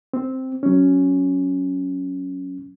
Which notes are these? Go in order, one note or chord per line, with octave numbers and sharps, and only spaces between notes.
C4
F#3 C#4